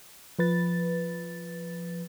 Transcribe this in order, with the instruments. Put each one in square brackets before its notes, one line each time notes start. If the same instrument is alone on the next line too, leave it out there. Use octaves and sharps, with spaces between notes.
[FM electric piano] F3 B4 A6